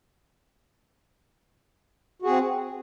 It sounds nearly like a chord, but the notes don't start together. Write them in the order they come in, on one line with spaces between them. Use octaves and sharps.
F#4 G#4 C4